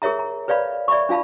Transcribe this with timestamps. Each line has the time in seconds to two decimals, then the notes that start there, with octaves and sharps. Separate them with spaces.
0.02 G#4 A#4 C#5 E5 A#5
0.19 A#5
0.48 B4 C#5 D5 F5 B5
0.88 D5 E5 B5 C#6
1.09 D4 F4 F5 A5 B5